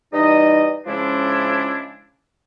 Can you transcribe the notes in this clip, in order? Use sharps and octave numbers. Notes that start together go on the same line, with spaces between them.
E3 G3 D#4 D#5
C#3 F3 G#3 C#4 D4 E4